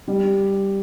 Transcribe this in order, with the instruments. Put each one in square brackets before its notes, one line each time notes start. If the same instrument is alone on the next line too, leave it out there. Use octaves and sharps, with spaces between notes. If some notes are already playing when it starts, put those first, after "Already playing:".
[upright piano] G3